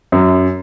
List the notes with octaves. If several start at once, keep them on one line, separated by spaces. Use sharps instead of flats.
F#2